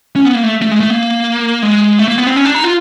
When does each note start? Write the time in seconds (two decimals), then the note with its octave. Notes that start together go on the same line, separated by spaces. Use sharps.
0.16 C#4
0.25 B3
0.34 A#3
0.43 A3
0.62 A3
0.71 G#3
0.80 A3
0.90 A#3
1.63 G#3
1.99 A3
2.08 A#3
2.18 B3
2.27 C4
2.36 C#4
2.45 D4
2.55 D#4
2.64 F4